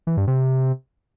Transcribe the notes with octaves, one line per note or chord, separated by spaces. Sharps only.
E3
G2
C3